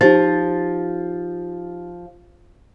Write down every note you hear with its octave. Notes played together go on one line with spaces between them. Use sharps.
F3 D#4 G4 A6